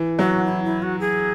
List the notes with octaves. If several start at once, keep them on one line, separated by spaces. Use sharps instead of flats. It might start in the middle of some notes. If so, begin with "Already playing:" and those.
Already playing: E3
F#3 F#4
E4
E4
F#4
G#4